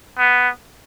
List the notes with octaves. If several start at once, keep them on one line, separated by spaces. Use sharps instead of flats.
B3